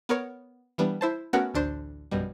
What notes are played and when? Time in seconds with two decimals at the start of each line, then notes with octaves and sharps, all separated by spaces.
0.09 B3 A#4 C#5
0.78 E3 G3 B3 D4
1.01 E4 C5 A5
1.33 A3 B3 C#4 F#4 A#4 F#5
1.54 A1 D2 D4 C5
2.11 A#1 F#2 B2 G3